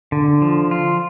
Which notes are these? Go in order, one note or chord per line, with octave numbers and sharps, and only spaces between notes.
D3
F3
F4